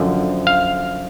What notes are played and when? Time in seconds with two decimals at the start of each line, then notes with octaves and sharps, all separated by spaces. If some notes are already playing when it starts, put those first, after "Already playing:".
Already playing: F#2 D3 F3
0.47 F5